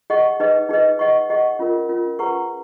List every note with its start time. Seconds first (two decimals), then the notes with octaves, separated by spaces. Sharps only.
0.10 G#4 D#5 F#5 C#6
0.40 D#4 G#4 B4 D#5
0.69 D#4 G#4 B4 D#5
0.99 G#4 D#5 F#5 C#6
1.30 G#4 D#5 F#5 C#6
1.59 C#4 F4 A#4
1.89 C#4 F4 A#4
2.19 G#4 B4 F#5 A#5 C#6